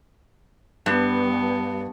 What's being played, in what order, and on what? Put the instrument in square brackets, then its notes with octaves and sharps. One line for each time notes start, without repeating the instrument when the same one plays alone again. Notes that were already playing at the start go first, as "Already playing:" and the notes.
[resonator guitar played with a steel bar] G2 [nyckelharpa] B3